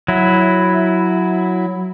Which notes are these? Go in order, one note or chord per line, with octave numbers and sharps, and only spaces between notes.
F#3 E4